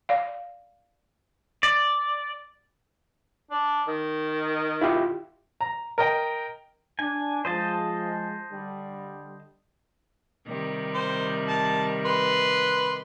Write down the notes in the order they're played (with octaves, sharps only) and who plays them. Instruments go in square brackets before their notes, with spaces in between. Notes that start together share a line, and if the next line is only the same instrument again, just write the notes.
[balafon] D5 F5
[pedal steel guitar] D5
[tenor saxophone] D4
D#3
[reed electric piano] E4 F4 G4
[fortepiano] A#5
A#4 D#5 G5
[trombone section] D4 [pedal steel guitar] G#5
[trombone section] F3 G#3 [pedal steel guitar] C5 D#5 A5
[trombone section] D3 G3
[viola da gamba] C3 D#3 G3
[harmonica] C5
A5
B4 C6